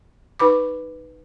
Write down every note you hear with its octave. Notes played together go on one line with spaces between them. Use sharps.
D#4 B4 B5 D6